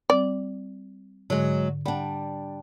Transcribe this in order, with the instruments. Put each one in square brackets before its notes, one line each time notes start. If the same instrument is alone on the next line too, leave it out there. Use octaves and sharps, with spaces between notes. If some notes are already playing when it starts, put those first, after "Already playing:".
[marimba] G3 C4 [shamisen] D5
[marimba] G#2 D3 [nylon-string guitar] F#3 G#3
[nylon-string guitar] G3 D4 [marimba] F#5 B5